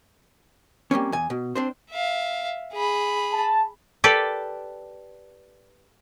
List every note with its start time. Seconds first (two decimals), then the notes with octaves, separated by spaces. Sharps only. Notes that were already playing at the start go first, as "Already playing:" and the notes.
0.91 G3 A#3 C4 C#4
1.12 E2 G#5
1.30 B2
1.55 C4 D4 C5
1.91 E5 F5
2.73 G#4 B5
3.32 A5
4.04 G4 A4 B4 D5